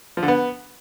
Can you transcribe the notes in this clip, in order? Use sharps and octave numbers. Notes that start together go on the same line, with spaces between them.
F3
D3
B3